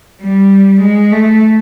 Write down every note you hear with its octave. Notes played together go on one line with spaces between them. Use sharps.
G3
G#3
A3